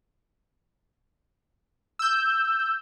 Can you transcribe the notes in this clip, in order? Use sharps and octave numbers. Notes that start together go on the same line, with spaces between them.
E6 G6